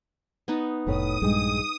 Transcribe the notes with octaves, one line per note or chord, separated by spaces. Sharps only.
B3 D#4
F1 A2 B4 C#5 D#6
A#1 G2 G#3 G4 G#4